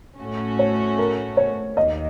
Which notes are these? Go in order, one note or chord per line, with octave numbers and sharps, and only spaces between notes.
A2 A3 C#4 F#4
C#5
A#4
C#5
D#2 D#3 A#3 D#5